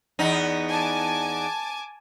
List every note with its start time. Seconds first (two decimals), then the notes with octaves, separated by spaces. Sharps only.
0.19 E2 B3 D#4
0.69 G#5 A5 D6